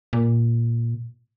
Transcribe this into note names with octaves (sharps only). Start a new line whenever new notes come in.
A#2